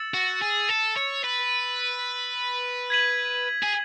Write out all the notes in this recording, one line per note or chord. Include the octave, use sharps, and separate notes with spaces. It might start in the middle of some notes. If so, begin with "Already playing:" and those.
Already playing: E6 A6 C#7 E7
F#4
G#4
A4
C#5
B4
G#6 B6 D#7 F#7
G#4